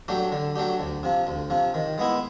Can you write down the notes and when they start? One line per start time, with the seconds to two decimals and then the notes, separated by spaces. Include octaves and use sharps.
0.08 F#3 A3 D4 G4
0.32 D3
0.56 F#3 A3 D4 G4
0.80 D2
1.03 C3 F3
1.27 D2
1.50 C3 F3
1.74 D#3
1.98 G#3 B3 E4